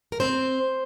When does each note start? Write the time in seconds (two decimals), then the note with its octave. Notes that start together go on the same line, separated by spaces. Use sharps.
0.12 A#4
0.20 C4 C5